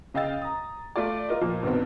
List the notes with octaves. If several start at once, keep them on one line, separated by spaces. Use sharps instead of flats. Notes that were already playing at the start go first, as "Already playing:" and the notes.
C#3 D#5 F5 G5 E6 A6
A#5 D#6
A3 F4 D5
F4 A#4 D#5
A#2 F3 A#3
G2 B2 D#3 B3 C4